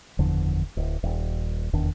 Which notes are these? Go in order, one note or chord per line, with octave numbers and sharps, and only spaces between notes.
F#1 E2 D3 F3
D1
D#1
F1 E2 D#3 D4